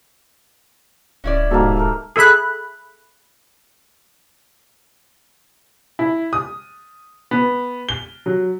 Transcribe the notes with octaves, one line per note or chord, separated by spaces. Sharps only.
D1 C#4 E4 D5
G#2 B2 A#3 G4 A4
A3 A#4
G#4 A4 E5 B5 F#6
E4
D#6
B3
G7
F#3